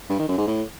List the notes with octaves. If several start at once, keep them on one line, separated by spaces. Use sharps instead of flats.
G2
D#3
F#2
G#2
A2